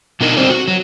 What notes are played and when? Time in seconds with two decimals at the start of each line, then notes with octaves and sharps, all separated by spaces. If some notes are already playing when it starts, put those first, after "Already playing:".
0.21 B2 D4 D#4 A#4
0.37 D3 G3 C4 C5 D5
0.50 F#4
0.68 F#3